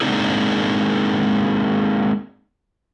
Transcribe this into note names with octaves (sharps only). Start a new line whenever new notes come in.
G#3 A#3 C4 D4 D#4 G#4